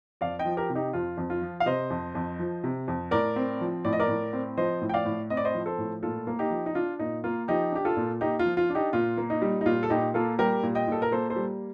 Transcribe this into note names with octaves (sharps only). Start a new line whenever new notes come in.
F2 D5 F5
D#5 G5
F3
G4 A#4
C3
D#4 G4
F2 F4
F2
F4
F3
F5
C3 C5 D#5
F2
F2
F3
C3
F2
A2 A#4 D5
C4
F3
A2 D5
D#5
A#4 D5
A2
C4
F3 C5 D#5
A2
G5
D5 F5
A2
C4 D#5
D5
C5 D#5
F3
A4 C5
A2
A#2 F4 A4
A#3
D#4 G4
F3
D#4
D4 F4
A#2 D#4
A#3 F4
F3 D#4 G4
D4 G4
F4 A4
A#2
A#3 D#4 G4
F4
F3
F4
D4
D#4 G4
A#2 F4
A#3
D#4
G3
D#4
A#2 F4
A4
A#2 D#4 G4
A#3 F4 A4
G3 G4 A#4
A#2
D#5 G5
A#2 A4
A#4
A#3 A4 C5
A4 C5
G3